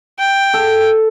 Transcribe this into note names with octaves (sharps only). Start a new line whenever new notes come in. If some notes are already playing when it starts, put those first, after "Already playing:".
G5
A4